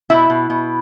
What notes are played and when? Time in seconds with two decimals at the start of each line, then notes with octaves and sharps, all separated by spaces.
0.10 B2 E4 E5
0.30 B2
0.50 B2